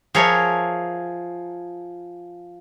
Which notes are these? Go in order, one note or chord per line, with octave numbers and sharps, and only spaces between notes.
F3 G#4 A#4 C#5 E5